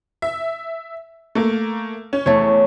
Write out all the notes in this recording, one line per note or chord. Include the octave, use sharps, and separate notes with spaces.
E5
A3 A#3
C#4
E2 A3 C#5